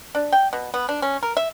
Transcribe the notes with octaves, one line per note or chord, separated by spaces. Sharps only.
D4
G5
B2
B3
D4
C#4
A#4
E5